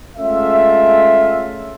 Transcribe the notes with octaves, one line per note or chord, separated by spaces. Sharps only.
G#3 A3 C#4 F4 E5